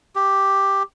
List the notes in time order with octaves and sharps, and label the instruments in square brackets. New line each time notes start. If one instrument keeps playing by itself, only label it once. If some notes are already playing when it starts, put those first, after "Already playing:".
[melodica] G4